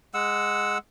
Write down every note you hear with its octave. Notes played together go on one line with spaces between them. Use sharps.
G#3 F#5 E6